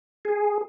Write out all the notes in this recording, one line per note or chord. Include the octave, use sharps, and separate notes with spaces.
G#4